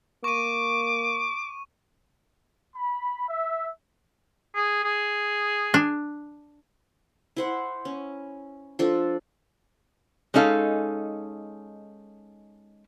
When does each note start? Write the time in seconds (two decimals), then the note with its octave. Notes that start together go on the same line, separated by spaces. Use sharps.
0.24 A#3 C#6 D6 D#7
2.75 B5
3.28 E5
4.55 G#4
4.84 G#4
5.74 D4
7.37 E4 C5 F#5
7.85 C#4
8.79 F3 D4 A4
10.34 G#3 C#4 D#4 A4 F5